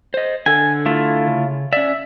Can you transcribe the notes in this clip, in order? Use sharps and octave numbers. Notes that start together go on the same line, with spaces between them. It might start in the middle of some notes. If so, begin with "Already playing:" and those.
C5 D#5
D3 A4 G#5
A3 E4 F4
C#3
C#4 D5 E5